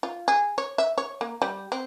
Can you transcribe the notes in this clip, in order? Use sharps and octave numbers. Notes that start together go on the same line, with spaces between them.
F4
G#4
C#5
E5
C#5
A#3
G3
C4